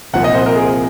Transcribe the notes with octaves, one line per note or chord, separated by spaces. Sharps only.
C2 A#2 F3 F#5
D#5
C5
A#4
G#4